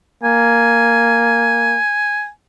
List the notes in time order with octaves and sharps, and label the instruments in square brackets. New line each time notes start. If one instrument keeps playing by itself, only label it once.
[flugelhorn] A#3 [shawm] G#5